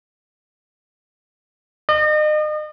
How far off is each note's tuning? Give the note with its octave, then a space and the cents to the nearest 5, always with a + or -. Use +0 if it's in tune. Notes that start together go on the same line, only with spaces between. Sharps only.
D#5 -35